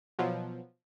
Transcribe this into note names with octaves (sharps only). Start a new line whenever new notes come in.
B2 F3 F#3